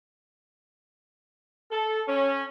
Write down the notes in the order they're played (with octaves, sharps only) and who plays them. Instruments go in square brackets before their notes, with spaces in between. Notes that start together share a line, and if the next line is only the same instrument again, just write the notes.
[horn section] A4
C#4